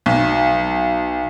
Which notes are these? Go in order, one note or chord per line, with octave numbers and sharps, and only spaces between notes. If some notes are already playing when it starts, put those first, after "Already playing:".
B1